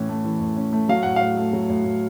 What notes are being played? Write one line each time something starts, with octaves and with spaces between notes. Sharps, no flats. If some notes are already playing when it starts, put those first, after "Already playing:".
Already playing: A2 E3 C#4
A3
E3
A2
C#4
A3
F#3 F5
A2 F#5
A2 F5
A3
F#3
A2
A2